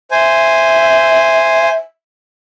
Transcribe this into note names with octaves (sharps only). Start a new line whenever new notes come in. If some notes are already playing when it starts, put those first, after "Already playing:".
C5 E5 G#5